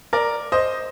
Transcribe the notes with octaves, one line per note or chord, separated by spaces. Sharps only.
A#4 D5
C5 D#5